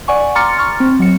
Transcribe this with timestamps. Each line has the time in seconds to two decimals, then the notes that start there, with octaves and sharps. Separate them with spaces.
0.08 D5 F#5 G#5 C#6
0.35 A#5 C6 D6 F6 A6 C#7
0.58 C#6 F6 A6
0.80 C4
1.00 F#3 C#7